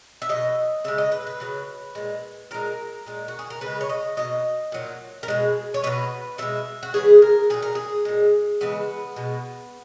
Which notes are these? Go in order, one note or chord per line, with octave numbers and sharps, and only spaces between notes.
E5
B2 F#3 D#5
C#3 G#3 E5
D#5
B4
B4
C#3 F#3
A#2 G#3
A#2 G#3 A#4
A#2 G#3
F#4
G#4
A#4
C#3 G#3 B4
C#5
D#5
B2 F#3 D#5
A#2 F#3
A#4
B2 G#3 G#4
C#5
B2 F#3 B4
B2 G#3 E5
F#4
C#3 E3 G#3 G#4
A#4
A#2 F#3 G#4
A#4
G#4
A#2 G#3
C#3 E3 G#3 B3
B2 G#3